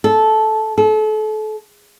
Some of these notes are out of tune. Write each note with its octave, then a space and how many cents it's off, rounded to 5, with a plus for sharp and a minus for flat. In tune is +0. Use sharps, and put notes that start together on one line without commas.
A4 -10
A4 -35